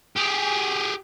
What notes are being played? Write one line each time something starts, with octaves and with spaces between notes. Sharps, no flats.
G4 G#4